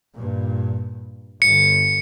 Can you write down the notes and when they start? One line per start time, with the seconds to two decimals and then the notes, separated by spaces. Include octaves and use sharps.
0.16 G2 A#2
1.42 G1 D3 C#7